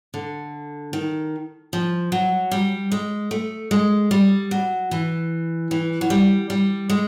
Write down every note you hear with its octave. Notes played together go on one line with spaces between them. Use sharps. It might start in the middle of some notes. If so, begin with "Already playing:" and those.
D3
D#3
F3
F#3
G3
G#3
A3
G#3
G3
F#3
E3
E3
F#3
G3
G3
G#3